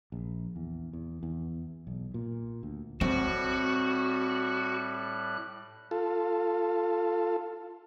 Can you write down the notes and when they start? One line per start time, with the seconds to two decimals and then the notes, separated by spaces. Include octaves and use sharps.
0.12 A#1
0.56 E2
0.93 E2
1.23 E2
1.87 B1
2.14 A#2
2.63 D2
3.01 A2 G3 C4 F#4 F#6
5.91 F4 A4